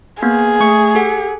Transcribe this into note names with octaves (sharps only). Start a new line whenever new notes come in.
A#3 B3 G#4
A3 C#6 C#7
G4 A4 F#5